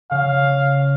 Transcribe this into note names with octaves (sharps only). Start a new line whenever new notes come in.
C#3 F5